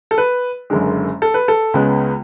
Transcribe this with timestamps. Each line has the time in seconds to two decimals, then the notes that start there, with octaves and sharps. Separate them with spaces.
0.11 A4
0.18 B4
0.70 F#1 F#2 D3 G#3
1.22 A4
1.34 B4
1.48 A4
1.74 C#2 C#3 G#3 B3